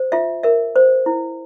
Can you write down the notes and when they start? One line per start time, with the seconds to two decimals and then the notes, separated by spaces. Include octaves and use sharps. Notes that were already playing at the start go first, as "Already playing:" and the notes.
Already playing: C5
0.12 F4 E5
0.43 A#4 E5
0.76 C5
1.06 E4